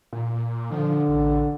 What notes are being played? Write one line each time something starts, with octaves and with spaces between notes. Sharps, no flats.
A#2
D3 F3
A1